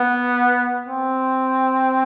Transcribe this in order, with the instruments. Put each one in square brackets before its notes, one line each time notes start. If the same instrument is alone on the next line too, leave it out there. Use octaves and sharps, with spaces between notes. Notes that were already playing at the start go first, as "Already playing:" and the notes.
Already playing: [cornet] B3
C4